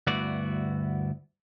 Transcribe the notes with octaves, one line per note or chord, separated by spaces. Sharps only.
D2 G2 B3 E4 F#4 D5